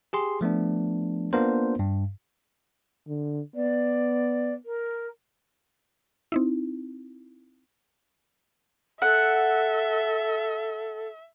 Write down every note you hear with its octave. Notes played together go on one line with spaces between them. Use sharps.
G4 G#4 C6
F3 A3 B3 D4
A#3 B3 D4 F4 A#4 C5
G2
D3
B3 D5
A#4
C4 D#4 E4
A4 E5 F#5